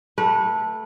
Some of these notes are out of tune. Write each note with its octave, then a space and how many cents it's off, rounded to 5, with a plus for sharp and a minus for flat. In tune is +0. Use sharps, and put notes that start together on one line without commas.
A3 +0 B4 -30